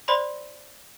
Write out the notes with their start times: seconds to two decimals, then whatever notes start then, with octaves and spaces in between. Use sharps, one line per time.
0.08 C5 D5 B5 C6